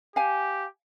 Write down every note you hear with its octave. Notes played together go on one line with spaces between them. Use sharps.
G4 F5 G#5